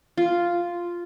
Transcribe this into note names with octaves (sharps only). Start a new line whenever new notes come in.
F4